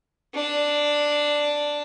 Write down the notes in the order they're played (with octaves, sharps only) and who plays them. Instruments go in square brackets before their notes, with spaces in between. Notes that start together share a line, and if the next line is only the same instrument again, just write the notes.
[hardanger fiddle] D4